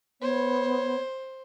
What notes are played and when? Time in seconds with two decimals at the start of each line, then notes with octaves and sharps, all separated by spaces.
0.21 B3 C5 C#5